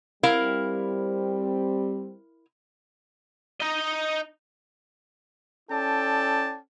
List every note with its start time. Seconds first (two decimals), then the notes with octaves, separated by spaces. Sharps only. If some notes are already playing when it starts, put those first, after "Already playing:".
0.23 G3 C4 E4 A#4 F5
3.60 D#4 D#5
5.70 C#4 E4 A4 D5 G5 A5